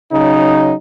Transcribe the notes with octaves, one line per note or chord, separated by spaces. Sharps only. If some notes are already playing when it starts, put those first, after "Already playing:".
C#3 F#3 D#4